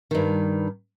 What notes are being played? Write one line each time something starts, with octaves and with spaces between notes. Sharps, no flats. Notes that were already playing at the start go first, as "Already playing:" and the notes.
G2 D#3